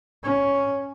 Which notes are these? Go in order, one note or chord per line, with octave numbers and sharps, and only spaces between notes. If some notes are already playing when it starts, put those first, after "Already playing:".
C#4